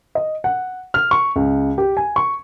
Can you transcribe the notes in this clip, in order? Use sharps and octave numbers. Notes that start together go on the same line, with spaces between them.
D#5
F#5
F6
C#6
C#2
G4
G#5
C#6